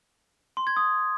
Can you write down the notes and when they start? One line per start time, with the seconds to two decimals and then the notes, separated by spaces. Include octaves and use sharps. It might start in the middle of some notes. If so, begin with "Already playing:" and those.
0.57 C6
0.67 G#6
0.76 D#6